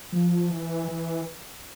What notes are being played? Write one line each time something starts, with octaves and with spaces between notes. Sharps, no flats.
F3
E3
E3